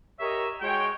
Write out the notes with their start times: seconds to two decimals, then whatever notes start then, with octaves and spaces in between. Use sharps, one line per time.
0.20 G4 A#4 C#5 D#5 E5
0.61 G#3 F#4 C#5 G5